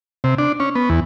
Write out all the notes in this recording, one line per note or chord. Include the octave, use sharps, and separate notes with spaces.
C3
D4
C#4
B3
E2